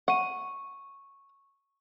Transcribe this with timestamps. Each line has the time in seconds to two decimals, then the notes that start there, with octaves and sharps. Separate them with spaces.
0.08 F#5 C#6 D#7